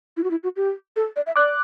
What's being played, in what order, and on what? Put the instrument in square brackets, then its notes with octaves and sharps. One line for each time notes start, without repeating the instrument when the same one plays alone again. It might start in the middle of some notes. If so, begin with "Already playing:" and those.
[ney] E4
F#4
E4
F#4
G4
A4
D5
E5
[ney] D5 [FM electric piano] D6 F#6